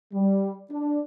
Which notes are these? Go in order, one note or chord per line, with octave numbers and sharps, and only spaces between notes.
G3
D4